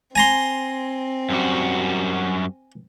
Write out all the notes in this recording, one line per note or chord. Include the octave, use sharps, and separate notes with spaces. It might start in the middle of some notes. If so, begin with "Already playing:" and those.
C4 G#5 A#5 C6
F#2 G3 F#4